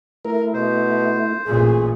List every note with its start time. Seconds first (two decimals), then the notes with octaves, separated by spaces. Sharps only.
0.25 A3 E4 A#4
0.54 B2 C5
1.46 A1 A#2 G#4